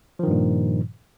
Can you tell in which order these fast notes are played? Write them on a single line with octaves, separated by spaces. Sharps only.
F3 D#3 G2 A#2